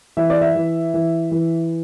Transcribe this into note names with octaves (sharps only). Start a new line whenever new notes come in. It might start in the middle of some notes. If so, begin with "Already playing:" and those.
E3 E5
D5
E5
E3
E3
E3